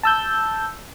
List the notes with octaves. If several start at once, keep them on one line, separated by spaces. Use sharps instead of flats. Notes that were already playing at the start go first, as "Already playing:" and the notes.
A5 E6 G6